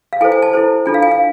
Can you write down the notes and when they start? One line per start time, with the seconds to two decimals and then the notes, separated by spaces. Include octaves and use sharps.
0.13 F5
0.21 E4 A4 C5 G#5
0.32 G#5
0.42 A5
0.53 E4 A4 C5
0.86 D4 F4 A4 G#5
0.94 F5
1.03 G#5
1.11 F5